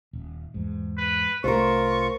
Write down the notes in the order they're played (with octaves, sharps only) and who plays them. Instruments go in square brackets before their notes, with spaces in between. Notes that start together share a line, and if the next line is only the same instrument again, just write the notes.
[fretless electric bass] D#1
E2 G#2
[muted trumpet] B4
[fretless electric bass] C2 A3 [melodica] F4 [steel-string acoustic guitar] A#4 C5 [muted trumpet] C#6